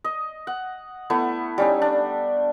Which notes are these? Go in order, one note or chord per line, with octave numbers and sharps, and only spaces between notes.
D#5
F#5
A3 B3 E4
G3 C#4 D#4
D4